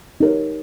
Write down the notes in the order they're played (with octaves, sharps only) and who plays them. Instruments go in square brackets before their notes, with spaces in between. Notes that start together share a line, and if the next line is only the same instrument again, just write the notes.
[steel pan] D#4 G4 A#4 C#5